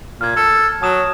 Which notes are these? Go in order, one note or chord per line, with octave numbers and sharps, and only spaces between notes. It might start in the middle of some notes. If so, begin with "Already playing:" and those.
A#2 F6 G#6
A4
F#3 A5 D#6 E7